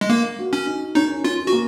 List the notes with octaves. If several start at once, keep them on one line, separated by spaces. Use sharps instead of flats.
G#3
A#3 A#4
F#4
C#4
D#4
C#4 D#4
C#4 F4
F#4
A#3